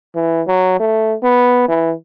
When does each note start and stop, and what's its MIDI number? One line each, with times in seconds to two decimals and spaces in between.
0.15 0.42 52
0.47 0.76 54
0.80 1.15 57
1.23 1.64 59
1.68 1.93 52